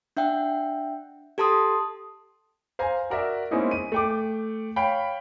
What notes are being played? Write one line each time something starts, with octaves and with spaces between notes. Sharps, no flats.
D4 E5 F#5 G5
G4 A4 A5 C6 D#6
C5 F5 G#5 A#5
F#4 A#4 D5 E5
G#3 A#3 C4 C#4 D#4 E4
D#7
A3 G5 D6
C#5 F5 G5 B5